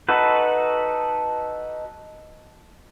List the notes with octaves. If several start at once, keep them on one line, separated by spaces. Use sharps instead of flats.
D#4 F#4 A4 B4